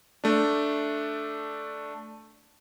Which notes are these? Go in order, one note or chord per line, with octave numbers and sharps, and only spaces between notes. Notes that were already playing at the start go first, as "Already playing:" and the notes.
A3 D4